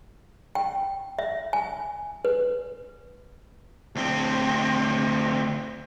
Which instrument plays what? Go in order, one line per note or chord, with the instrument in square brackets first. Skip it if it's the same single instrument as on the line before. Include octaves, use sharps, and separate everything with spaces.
[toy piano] G5
E5
G#5
B4
[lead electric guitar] D2 C4